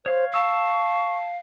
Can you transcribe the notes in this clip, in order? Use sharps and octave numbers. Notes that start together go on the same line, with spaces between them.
C5 C#5 F5
F5 A5 C#6 E6